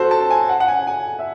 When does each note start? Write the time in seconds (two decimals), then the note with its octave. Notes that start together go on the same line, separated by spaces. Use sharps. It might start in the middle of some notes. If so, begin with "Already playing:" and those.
Already playing: F#4 A4 C5
0.11 A5
0.30 G#5
0.49 F#5
0.60 F#5
0.68 G#5
0.87 G#5
1.19 E5